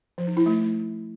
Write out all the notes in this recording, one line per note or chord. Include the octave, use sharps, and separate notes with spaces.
F3
D#4
E4
A3